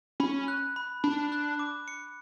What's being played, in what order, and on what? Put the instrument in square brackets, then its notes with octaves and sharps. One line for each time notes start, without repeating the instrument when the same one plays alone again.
[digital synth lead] C#4 [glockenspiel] B5
[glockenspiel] F#6
B5
[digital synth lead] D4 [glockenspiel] B5
[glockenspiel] F#6
D6
C#7